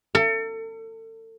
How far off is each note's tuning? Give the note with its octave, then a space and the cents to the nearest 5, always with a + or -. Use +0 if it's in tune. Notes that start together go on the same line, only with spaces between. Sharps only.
A4 +35